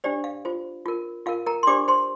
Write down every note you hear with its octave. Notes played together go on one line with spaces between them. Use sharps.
D4 G4 C5 D5
F5
F4 C5
F4 A#4
F4 A#4 F5
A#4 A#5
C6
D4 G4 C5 D5 D6
C5 C6